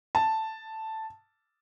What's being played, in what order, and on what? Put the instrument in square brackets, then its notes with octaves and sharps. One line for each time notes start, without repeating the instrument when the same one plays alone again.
[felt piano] A5